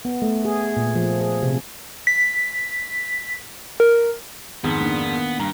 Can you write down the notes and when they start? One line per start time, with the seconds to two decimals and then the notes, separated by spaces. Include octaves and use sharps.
0.05 B3
0.22 A3
0.45 G#4
0.77 A#2
0.95 F3
1.21 G#4
1.43 C3
2.07 B6
3.80 A#4
4.64 F2 G#2 D#3 B3
4.81 A#3 D4
5.40 G2 A#5